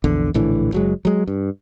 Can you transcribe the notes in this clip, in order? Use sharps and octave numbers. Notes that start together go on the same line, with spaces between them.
A#1 E2 D3
A#1 A2 D3 E3
F#1 F#3 G#3
F#3 G#3
G2